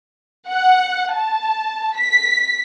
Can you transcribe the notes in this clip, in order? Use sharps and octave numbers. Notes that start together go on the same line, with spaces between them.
F#5
A5
B6